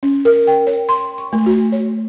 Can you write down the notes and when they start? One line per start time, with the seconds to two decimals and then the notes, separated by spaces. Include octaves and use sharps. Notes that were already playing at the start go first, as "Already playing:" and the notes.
0.03 C#4
0.25 A#4
0.47 G5
0.67 C#5
0.89 C6
1.18 C#6
1.33 A3
1.46 F#4
1.72 C#5